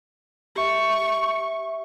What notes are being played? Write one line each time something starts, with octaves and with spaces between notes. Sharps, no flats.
G4 E5 C#6